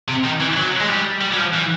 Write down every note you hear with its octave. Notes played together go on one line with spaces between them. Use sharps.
C3
D#3
E3
F#3
G#3
G3
G3
F#3
F3
E3